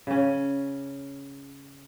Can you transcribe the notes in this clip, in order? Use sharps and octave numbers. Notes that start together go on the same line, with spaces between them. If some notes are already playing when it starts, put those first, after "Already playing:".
C#3 C#4